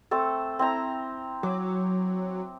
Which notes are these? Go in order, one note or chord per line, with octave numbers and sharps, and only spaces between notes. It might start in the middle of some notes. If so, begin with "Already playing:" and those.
A3 C4 A4
C4 E4 A#5
F#3 D6